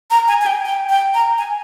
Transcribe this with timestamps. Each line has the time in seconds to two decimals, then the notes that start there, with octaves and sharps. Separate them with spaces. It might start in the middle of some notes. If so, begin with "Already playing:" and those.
0.11 A#5
0.28 G#5
0.41 G#5
0.46 G5
0.65 G5
0.89 G5
1.14 A#5
1.38 G#5